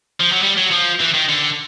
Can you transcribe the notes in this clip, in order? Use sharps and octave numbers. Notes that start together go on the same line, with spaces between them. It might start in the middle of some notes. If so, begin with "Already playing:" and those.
F3
F#3
G3
F#3
F3
E3
D#3
D3